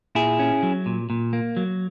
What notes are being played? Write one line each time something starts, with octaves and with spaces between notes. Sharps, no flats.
A#2 E4 G#4
C#4
F#3
A#2
A#2
A#3
F#3